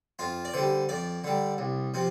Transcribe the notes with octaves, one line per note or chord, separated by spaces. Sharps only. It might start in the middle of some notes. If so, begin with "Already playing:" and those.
F2 F4
D5
D3 G3 C5
F2 D5
D3 G3
C2
C3 F3